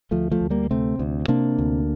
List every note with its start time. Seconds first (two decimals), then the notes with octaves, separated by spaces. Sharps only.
0.11 D2 F3 A3
0.31 F3 A3
0.41 D2
0.50 G3 A#3
0.71 C3 A3 C4
0.99 D2
1.28 C3 A#3 D4
1.58 D2